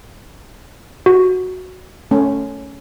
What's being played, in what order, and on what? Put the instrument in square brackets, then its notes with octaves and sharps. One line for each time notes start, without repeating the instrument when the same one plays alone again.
[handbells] F#4
[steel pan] A3 C#4